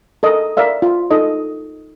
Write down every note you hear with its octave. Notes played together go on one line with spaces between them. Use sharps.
A4 A#4 D#5
A#4 D5 E5 F5
F4
D#4 A4 D#5